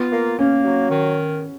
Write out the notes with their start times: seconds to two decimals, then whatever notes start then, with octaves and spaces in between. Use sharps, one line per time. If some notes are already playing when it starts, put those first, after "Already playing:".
Already playing: B3 F4
0.12 A#3
0.38 A#3 C#4
0.65 F#3
0.91 D#3